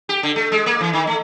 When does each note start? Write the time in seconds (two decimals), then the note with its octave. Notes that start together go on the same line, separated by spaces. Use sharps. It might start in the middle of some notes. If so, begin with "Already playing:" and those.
0.09 G4
0.23 D3
0.36 A3
0.52 G#3
0.66 A#3
0.81 E3
0.93 D#3
1.07 A3